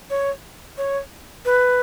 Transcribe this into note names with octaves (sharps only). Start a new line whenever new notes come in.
C#5
C#5
B4